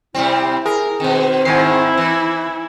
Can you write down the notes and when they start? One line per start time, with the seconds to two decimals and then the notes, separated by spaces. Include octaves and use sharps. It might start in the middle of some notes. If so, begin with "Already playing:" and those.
0.15 C3 G3 C4 E4
0.66 G#4 A#4
1.00 B2 D#3 C4
1.45 G#2 D#3 E4 G#5 C7
1.97 E3